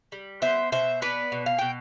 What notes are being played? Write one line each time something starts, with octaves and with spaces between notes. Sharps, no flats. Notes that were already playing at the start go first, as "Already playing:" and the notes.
G3
B3 C5 E5
B2 C5 E5
B3 B4 D5
B2
F5
B2 G5